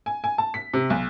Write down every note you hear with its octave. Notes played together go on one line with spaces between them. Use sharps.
G#5
G#5
A5
B6
C3
B1